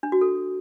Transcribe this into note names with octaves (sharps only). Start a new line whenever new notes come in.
D4
F#4
A4